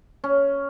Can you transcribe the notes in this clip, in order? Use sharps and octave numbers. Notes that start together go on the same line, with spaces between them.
C#4